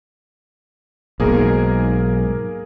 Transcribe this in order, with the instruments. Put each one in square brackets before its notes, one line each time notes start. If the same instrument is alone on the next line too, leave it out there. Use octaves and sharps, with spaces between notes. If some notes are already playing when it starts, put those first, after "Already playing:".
[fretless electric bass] B1 G#2 [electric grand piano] A#3 G#4 A#4